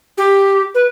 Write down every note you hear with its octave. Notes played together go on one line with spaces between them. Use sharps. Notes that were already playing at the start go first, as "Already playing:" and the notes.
G4
B4